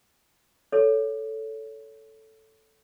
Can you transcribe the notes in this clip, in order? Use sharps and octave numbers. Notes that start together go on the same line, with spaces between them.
A4 C#5